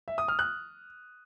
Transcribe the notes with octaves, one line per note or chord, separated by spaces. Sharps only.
E5
D#6
F6
F#6